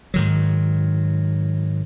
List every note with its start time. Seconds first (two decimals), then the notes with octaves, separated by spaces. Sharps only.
0.14 G#2 D#3 F#3